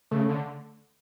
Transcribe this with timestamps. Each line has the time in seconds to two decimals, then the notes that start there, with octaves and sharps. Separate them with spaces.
0.11 C#3 A3
0.29 D3